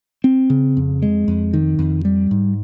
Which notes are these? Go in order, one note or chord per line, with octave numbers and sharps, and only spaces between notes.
C4
C#3
F2
G#3
F2
D#3
F2
G3
G#2